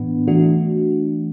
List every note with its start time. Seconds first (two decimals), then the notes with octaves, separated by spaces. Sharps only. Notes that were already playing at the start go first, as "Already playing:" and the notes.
Already playing: A2 E3 B3 D4
0.27 E3 A3 D4 F#4